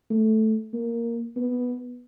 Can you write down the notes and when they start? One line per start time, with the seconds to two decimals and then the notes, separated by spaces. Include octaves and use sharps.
0.10 A3
0.73 A#3
1.36 B3